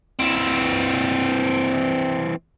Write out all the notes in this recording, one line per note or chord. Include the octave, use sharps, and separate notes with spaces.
E3 C4